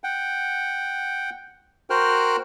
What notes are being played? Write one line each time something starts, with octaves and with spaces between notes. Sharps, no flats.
F#5 G5
F#4 A#4 C5 G5 F6 F#6